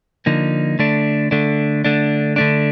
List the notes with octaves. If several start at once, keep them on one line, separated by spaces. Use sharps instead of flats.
D3 F3 A#3 D#4
D3 A3 D4
D3 A3 D4
D3 A3 D4
D3 A3 D4